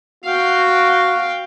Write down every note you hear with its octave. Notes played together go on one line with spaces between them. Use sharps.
F#4 F5 G5